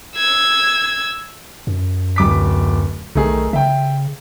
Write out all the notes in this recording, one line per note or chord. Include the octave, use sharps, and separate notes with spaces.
E6 G#6
F#2
D1 D6 B6
B1 D#3 A3 G#4
C#3 E5 G5